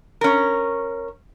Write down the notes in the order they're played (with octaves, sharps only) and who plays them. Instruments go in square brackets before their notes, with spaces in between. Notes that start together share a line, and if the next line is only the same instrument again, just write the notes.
[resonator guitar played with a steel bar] C#4 A#4